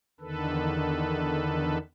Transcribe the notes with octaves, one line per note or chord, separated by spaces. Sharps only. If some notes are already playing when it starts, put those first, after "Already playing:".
E2 D3 D#3 A4 B4